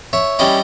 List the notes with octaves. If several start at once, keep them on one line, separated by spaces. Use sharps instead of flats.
C#5 E5
G3 C#4 E4 D#5 G5